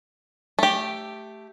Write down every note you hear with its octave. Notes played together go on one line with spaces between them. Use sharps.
A3 G4